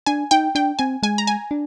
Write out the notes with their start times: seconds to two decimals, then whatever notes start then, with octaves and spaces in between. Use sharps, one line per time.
0.06 D4 G#5
0.31 D#4 G5
0.55 D4 G5
0.79 C4 G#5
1.03 G#3 G#5
1.18 A#5
1.27 G#5
1.51 D4